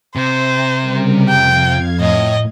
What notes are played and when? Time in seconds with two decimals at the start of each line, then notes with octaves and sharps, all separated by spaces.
0.16 C3 C5
0.80 C#3 G3 A#4
1.28 F2 F5 G5 G#6
2.01 A2 D#5